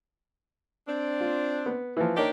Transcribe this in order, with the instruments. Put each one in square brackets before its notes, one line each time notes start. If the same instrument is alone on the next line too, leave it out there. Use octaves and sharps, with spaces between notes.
[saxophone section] C4 D4
[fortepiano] F4
B3
E3 F3
[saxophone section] D4 G4 [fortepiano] D#4 A#4 C#5